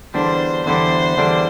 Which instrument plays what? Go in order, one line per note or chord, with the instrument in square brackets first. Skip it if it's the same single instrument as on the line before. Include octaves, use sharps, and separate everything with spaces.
[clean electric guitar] E2 D3 G3 D4 [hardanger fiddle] C5
[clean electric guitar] E2 D3 G3 D4 [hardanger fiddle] C5
[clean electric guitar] E2 D3 G3 D4